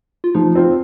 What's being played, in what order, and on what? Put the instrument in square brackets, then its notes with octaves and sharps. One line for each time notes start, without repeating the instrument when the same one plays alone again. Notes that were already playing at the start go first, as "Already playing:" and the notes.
[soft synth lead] F4
[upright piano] F3 [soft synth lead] D#4
[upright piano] C4 F4